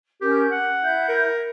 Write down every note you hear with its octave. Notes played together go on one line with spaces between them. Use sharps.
C#4 G4 A#4 G6
F#5 F#6
E4 E5 G6
A#4